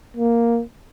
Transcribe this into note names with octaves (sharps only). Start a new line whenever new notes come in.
A#3